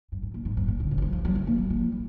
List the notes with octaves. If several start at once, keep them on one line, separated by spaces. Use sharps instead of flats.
G2
G#2
A#2
G#2
G2
A#2
D3
D#3
G3
F3
F3
G3
G#3
A#3
G3
F3
F3
G3